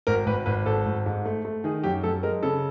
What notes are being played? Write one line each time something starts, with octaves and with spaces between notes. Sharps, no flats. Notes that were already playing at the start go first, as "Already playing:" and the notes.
G#1 A#4
G#1 B4
G#1 B4
G#1 A4
G#1
G#2
A3
A3
D#3 G#4
F#2 G4
F#2 A4
G#3 A#4
C#3 A4